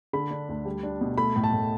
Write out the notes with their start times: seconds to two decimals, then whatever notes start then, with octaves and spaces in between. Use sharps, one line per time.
0.13 D3 B5
0.31 D4
0.49 D2
0.65 G3
0.83 D4
1.01 B2
1.18 A3 B5
1.36 A2
1.44 A5
1.53 A2